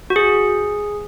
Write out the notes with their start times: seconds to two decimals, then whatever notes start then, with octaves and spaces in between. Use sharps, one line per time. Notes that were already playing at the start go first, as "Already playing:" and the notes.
0.10 F#4
0.16 G#4